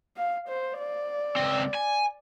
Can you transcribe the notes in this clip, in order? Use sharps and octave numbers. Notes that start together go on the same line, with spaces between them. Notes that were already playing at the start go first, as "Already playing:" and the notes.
F5
C5
D5
C#2 C4
G#5